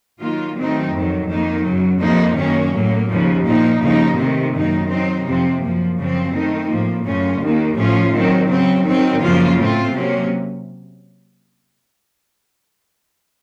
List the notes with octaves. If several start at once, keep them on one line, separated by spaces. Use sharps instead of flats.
D#3 F#3 A#3 F4
D#3 F#3 A3 C4 D#4
F2 D#3 F#3
F2 D#3 A#3 D#4
F#2 C#3 F#3
F2 C3 F3 A#3 D#4
F#2 D#3 A#3 C#4
A2 F#3 A#3
D#2 C#3 F3
A#2 F3 A#3 D#4
D#2 C#3 F3 A#3 D#4
C3 D#3 A3 C4
F#2 D#3 A#3 D#4
D#3 F#3 C4 D#4
F2 C3 F3 C4
F#2 F3 A#3
F#2 C#3 F3 C4
D#3 A3 C4 D#4
A2 F3 A#3
F#2 C#3 A3 C#4 F4
D#2 D#3 A#3
A2 F3 A3 C#4 F4
D#3 F#3 C4
C#3 F#3 C4
D#3 F#3 C4
F#2 C#3 F3 A#3 F4
A2 A3 C4 F4
C3 F#3 A#3 C#4